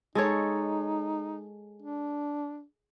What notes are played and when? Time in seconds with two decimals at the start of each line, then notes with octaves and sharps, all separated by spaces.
0.15 G#3 D#4 A4 C#5
1.82 D4